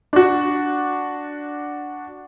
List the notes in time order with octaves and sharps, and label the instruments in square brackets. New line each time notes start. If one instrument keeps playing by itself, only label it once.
[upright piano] D4 F#4